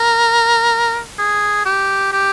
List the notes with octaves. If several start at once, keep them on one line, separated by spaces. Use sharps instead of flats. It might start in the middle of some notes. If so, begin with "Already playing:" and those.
Already playing: A#4
G#4
G4
G4